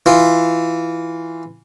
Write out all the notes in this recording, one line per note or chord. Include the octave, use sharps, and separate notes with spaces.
E3 F4